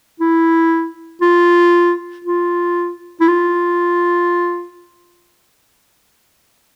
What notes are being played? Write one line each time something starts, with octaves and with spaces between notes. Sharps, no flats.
E4
F4
F4
E4
F4